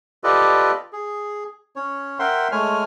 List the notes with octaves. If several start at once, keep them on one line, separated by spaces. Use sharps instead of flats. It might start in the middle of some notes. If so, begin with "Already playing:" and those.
F4 G4 A4 B4 D5 D#5
G#4
C#4 C#5
A#4 E5 F#5 G5 C6
G#3 A3 C#5 G#5 F6